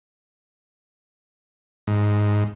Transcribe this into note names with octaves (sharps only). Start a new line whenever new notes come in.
G#2